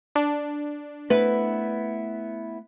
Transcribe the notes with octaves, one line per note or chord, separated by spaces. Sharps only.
D4
A3 B3 E4 B4